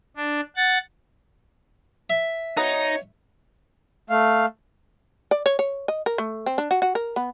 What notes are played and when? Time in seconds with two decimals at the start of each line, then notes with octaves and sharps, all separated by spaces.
0.16 D4
0.56 F#5 A6
2.10 E5
2.57 B3 D#4 F#4 C#5 A#5
4.10 A3 F5
5.31 D5
5.46 C#5
5.59 C#5
5.88 D#5
6.06 A#4
6.18 A3
6.46 C4
6.58 D4
6.71 F#4
6.82 F#4
6.95 A#4
7.16 B3